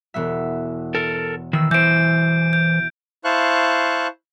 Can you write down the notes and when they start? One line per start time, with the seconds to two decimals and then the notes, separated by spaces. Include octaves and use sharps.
0.14 E1 B3 E5
0.95 A4 A#4
1.53 D#3 E3 E6
1.71 E3 C5 E5 G#5 G6 D7
2.53 G6
3.24 E4 C5 F5 A5 C#6 F#6